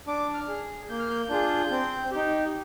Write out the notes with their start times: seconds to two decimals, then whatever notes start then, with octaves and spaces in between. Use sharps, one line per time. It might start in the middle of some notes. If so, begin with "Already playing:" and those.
0.07 D4 D6
0.34 F6
0.48 G#4
0.89 A#3 G6
0.99 F6
1.10 G6
1.29 D4 F4 G#4
1.71 C4
2.11 D#4 G4